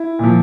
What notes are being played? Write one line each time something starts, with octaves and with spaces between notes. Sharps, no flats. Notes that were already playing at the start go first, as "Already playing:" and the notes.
Already playing: E4
A#2 F3